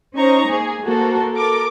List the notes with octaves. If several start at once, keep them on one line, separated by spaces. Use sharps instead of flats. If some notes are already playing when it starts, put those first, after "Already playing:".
C#4 D#4 C5 A#5 C#6
A#3 G#4
A#3 F#4 A4 A#4 C5
A4 A#4 D6